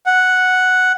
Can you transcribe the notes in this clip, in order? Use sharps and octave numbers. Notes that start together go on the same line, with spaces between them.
F#5